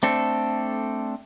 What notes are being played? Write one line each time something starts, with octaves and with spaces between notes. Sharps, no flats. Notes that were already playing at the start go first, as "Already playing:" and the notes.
A3 C4 D4 A4